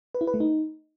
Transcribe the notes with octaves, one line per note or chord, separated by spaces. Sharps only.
B4
E4
B4
A3
D#4